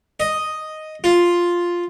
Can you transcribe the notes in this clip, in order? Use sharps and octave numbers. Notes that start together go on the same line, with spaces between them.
D#5
F4